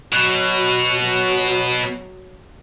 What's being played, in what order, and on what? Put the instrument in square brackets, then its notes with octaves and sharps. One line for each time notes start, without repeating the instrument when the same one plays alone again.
[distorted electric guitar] B2 [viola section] F#3 F#4
[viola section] F#3 F#4